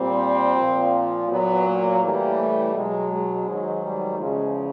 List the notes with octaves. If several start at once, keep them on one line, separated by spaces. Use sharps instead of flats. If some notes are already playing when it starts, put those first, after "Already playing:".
Already playing: A#2 G3 C4
A#2 F3
A#2 F#3 B3
A#3
A2 E3 G3
A3
B2 F#3 G#3
G#3
G#2 D#3 F#3
G3
E2 C#3 F3 G#3